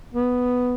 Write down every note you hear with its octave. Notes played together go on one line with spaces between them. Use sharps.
B3